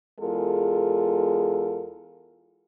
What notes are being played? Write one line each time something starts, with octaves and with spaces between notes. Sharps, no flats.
E2 G#3 F4 A4 A#4